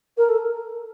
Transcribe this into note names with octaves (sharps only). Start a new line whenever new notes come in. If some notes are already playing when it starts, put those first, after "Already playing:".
A#4
A4